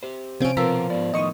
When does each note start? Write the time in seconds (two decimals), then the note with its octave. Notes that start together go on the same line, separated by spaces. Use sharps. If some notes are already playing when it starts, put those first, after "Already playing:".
0.03 G4 C5
0.40 C3 F3 C4 C#4 D7
0.57 B2 F3 F4 A#4 B4 A#5 E6
0.90 G#2 E3 B3 D5
1.14 A2 D#3 F3 D#5 C#6 D#6